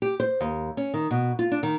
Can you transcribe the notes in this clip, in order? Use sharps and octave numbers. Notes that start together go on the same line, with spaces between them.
G4
C5
D#2
C#4
D#3
B2
F4
D4
D#3